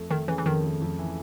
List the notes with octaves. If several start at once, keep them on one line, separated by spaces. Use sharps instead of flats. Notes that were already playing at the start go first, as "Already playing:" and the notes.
Already playing: F2 A3
D#3 A3
C#3 E3
E3
F2 D#3
A3
F2
E3